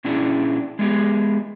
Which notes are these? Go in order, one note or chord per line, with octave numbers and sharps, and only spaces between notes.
A#2 C#4 D4 E4 G#4
G#3 B3 D#4 G4 G#4